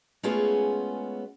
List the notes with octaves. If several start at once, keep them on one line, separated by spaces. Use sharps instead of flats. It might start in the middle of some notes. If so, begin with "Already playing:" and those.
G#3 A3 B3 C#4 F4 G#4